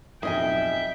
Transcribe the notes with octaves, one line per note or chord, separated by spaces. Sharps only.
B1 F2 G#4 D#5 E5 G5 G#5